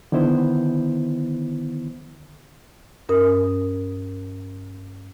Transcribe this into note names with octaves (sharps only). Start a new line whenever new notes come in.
D3 D#3 B3 E4 C5
G2 C#4 A#4 D#6